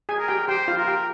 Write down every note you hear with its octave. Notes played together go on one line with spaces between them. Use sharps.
G#4 G#5
A#4
G4 G5
G4 C5 G5
F4 F5
A#4
G4 G5